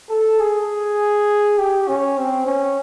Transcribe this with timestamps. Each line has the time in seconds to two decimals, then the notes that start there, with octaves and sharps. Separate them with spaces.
0.10 A4
0.39 G#4
1.58 G4
1.88 C#4
2.18 C4
2.46 C#4